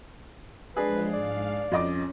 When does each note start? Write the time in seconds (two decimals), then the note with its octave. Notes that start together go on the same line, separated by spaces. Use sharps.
0.76 F3 G#3 D4 G#4 B4
1.13 G#2 D5 F5
1.72 F2 C#4 D#5 D6